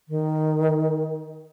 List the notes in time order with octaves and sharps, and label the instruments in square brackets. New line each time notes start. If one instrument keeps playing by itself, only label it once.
[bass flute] D#3